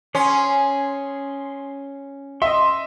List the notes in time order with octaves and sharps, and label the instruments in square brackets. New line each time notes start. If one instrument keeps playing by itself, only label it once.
[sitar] C#4 [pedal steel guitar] G#4 C6
[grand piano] D#5 E5 [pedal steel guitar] C6